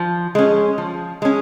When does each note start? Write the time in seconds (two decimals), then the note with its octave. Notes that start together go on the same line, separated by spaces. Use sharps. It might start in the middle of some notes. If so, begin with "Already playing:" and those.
Already playing: F3
0.35 G#3 C#4
0.78 F3
1.22 G#3 C#4